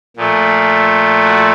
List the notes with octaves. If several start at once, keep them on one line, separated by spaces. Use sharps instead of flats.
A#2 F3 A3
F#4